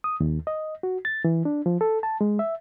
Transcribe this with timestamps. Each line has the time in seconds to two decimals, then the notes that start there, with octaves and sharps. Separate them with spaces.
0.04 D#6
0.20 D#2
0.47 D#5
0.83 F#4
1.05 A6
1.24 E3
1.45 D4
1.66 F3
1.81 A4
2.03 A5
2.21 G#3
2.39 E5